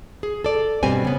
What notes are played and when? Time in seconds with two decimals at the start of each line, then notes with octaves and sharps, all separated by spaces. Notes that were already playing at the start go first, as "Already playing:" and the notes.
0.23 G#4
0.44 A4 D5
0.83 G2 B2 G3 C4 G#5
1.05 C#3 B3